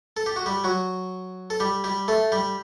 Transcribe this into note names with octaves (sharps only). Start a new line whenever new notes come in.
A4
G4
F#4
G3 G4
F#3 F#4
A4
G3 G4
G3 G4
A3 A4
G3 G4